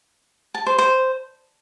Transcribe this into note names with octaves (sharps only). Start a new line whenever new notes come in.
A5
C5
C5